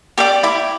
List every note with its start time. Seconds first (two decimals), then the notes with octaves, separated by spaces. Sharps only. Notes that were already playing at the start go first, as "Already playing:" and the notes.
0.18 G4 D5 D6
0.43 E4 D6